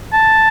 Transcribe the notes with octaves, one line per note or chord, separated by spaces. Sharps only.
A5